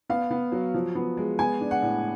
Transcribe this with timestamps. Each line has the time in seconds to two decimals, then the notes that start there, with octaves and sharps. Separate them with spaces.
0.09 B3 F5
0.31 B3
0.52 F#3
0.74 F3
0.95 B3
1.17 G#3
1.39 B3 G#5
1.61 D4
1.71 F#5
1.82 A2